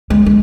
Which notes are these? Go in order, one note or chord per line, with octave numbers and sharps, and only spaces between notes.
G#3
G#3